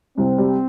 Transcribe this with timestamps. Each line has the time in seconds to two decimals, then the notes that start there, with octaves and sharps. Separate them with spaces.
0.17 C2 C4
0.38 G3